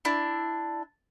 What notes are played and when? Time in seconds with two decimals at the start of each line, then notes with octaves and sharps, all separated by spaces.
0.05 D4 E4